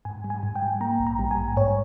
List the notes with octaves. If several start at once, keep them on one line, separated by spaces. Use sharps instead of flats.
G#2 G#5
G3
G#5
G#2
G5
G3
A#3 A#5
A#1
A#5
G3
G#5
G#2
G#2 C#5